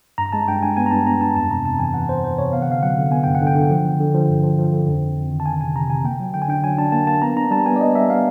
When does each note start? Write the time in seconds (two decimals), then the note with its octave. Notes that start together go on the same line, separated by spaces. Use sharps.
0.18 G2 A#5
0.32 G#3 A5
0.48 G2 G5
0.63 G2 G#5
0.77 B3 G#5
0.86 A#5
0.91 G2 A5
1.07 B3 A#5
1.21 G2 A5
1.36 F2 A5
1.50 C3 A#5
1.64 F2 A5
1.79 E3 G#5
1.94 E3 F#5
2.09 F2 C5
2.23 E3 C5
2.38 C3 C#5
2.53 B3 F5
2.62 F#5
2.68 D3 F5
2.83 F#3 F#5
2.97 D3
3.11 B3 G#5
3.24 G2 G5
3.35 F#5
3.42 D3
3.47 G5
3.55 D3
3.70 F3
3.85 D3
4.00 D3
4.15 F3
4.29 G2
4.43 F3
4.59 F3
4.73 D3
4.87 F2
5.02 F2
5.17 F2
5.31 D#3
5.40 A5
5.46 D#3 G#5
5.60 C3 G#5
5.75 C3 A#5
5.90 C3 G#5
6.04 A#3 G5
6.20 F#3
6.34 D3 G5
6.42 G#5
6.48 D4 G5
6.64 F#3 G#5
6.78 D4 A5
6.92 A#3 A5
7.07 A#3 A5
7.22 B3 A#5
7.37 D4 A#5
7.51 G3 A5
7.66 B3 G#5
7.76 D5
7.80 B3 D#5
7.95 G3 E5
8.10 B3 F5